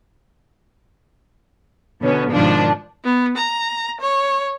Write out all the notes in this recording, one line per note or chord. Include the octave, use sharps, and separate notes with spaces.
B2 D3 B3 C#4
G#2 B2 D#3 F3 D4
B3
A#5
C#5